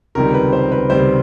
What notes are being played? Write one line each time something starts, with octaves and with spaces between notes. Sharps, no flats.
C#2 C3 D#3 G3 A#4
B4
C5
B4
C#2 C3 D#3 G3 C5